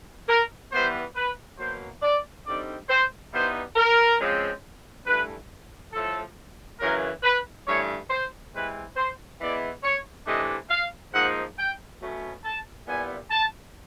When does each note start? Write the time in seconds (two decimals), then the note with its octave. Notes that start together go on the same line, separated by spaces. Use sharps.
0.29 A#4
0.72 E3 G3 B3 C5
1.16 B4
1.58 B2 F#3 A#3 C5
2.02 D5
2.46 D3 G3 C4 D#4 D5
2.89 C5
3.32 E3 G3 B3 D#4 C5
3.76 A#4
4.19 C#3 F3 G#3 C4
5.06 G2 E3 A3 B4
5.93 A2 F3 A3 A4
6.80 F#2 C#3 E3 A#4
7.23 B4
7.67 G2 E3 A3 C#5
8.10 C5
8.53 C3 E3 G#3 C4 B4
8.97 C5
9.40 E3 G#3 B3 E4 D5
9.84 C#5
10.27 C3 E3 A3 D4 D#5
10.70 F5
11.14 G#2 F3 A#3 D#4 F#5
11.58 G5
12.01 B2 F#3 A3 C#4
12.44 A5
12.87 A#2 G3 B3 E4 G#5
13.31 A5